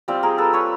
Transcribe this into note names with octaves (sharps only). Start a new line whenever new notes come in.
G3 C4 F4
G#4 A#4
A4 B4
B4 C#5